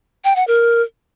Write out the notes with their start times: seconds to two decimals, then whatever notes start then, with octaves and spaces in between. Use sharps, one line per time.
0.24 G5
0.36 F#5
0.47 A#4